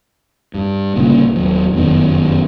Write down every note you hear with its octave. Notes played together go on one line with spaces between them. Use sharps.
G2
G1 G2 A#2 C#3
D#1 F#3
F1 F#2 D#3 B3